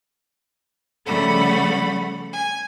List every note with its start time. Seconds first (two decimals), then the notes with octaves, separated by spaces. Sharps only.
1.06 C#3 F3 G3 A3 F#5 B5
2.33 G#5